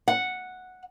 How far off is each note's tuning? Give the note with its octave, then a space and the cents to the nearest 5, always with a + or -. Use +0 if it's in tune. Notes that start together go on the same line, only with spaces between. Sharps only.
F#5 -5